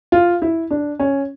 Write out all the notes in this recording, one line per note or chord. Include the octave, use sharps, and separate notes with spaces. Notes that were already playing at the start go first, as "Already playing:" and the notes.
F4
E4
D4
C#4